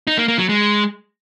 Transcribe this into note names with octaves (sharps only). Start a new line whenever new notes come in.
D#4
A#3
A#3
F#3
G#3